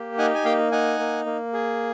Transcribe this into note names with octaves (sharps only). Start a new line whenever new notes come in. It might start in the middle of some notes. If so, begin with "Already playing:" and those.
Already playing: A#3 G4
D#4 F#5 G#5
G#5
A#3 F5 G5
D#4 F#5 G#5
A#3
A#3
G#4